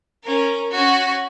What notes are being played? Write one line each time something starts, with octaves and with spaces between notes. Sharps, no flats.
C#4 A#4
C#4 F#4